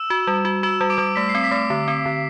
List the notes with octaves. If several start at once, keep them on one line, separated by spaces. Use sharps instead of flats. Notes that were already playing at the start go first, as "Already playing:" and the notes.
Already playing: E6 E7
F#4
G3
F#4
F#4 E6 E7
G3
D6 D7
G3
A3 B6
C7
C4
B6
A3
D3
C4
D3